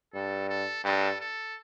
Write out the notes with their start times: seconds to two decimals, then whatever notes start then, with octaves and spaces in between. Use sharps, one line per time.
0.14 G2 A4
0.49 A4
0.84 G2 A4
1.20 A4